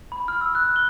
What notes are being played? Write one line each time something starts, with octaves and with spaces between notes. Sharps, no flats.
B5
F6
E6
F#6
G7